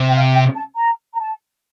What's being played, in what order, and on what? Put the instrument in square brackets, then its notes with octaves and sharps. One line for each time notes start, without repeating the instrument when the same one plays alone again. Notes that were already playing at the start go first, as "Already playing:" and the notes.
Already playing: [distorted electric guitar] C3
[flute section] G5
F5
G5
A5
A#5
A#5
A5